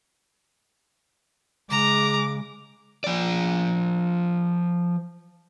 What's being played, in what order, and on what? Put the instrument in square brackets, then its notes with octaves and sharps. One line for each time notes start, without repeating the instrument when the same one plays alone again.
[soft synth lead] C#3 [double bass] G#3 [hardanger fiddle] A#5 [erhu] D6
[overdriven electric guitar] F3 D5